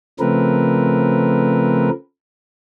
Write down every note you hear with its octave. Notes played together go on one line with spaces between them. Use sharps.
C#3 F3 A3 C4 A#4 B4